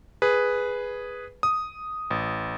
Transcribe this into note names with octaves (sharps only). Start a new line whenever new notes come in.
G#4 B4
D#6
A1